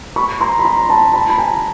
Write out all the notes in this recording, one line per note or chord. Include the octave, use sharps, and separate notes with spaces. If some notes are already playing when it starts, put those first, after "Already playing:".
B5 C#6
A#5 C6
B5
A#5 C6
A5 B5
A5 B5
B5
G#5 A#5